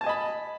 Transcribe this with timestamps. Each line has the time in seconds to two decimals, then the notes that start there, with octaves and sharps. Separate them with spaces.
0.01 A5
0.04 G#5
0.06 D#5
0.09 B5